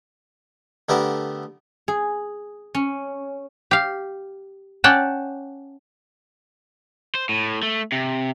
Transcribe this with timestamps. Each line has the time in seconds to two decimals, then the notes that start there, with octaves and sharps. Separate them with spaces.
0.89 D3 A3 B3 G4 A#4 E5
1.88 G#4
2.74 C#4
3.71 G4 F5
4.84 C#4 D5 F#5 G5 A5
7.15 C5
7.29 A2
7.63 A3
7.92 C3